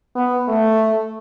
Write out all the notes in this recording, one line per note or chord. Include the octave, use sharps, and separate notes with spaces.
B3
A3